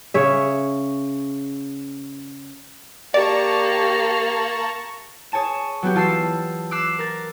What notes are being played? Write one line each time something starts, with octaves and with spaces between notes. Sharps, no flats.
C#3 C#5 E5
A#3 G4 D5 A5 A#5 C#6
G#4 C#5 G#5 A5 E7
F#3 B3 F#4 G4
E3 F4 A5 E6 C7
D6 E6 F#6 C7 E7
A#4 A6